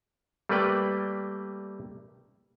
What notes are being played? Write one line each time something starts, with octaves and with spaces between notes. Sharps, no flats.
G3 A3 A#3 B4 D5 G5